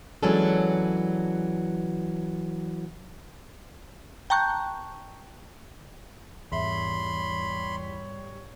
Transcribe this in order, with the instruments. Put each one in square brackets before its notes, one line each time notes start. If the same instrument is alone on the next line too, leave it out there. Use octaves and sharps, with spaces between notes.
[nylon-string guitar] E3 F#3 G#3 C#4 D4 A4
[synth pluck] G5 A5 A#5 C#6 F#6 G6
[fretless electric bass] E2 [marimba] G#2 E5 [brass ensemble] G3 C#5 [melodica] B5 C6